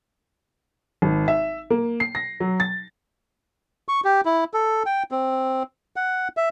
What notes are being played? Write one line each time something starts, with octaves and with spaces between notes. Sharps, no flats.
G#1
E5
A#3
C7
A#6
F#3
A6
C#6
G4
E4
A4
G5
C4
F#5
E5